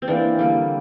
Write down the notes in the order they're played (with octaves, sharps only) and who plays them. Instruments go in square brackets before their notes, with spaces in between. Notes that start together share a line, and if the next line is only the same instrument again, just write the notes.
[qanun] C4
E3 A#3 D4
D3 G3 A#3